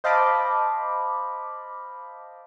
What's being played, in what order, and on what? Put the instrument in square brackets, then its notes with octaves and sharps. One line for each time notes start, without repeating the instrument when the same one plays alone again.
[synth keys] C5 D#5 F5 A5 B5 D6